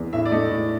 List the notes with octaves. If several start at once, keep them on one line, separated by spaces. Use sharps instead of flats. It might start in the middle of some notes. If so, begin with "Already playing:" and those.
Already playing: E2
A2 E5
D5
A3 D#5
A2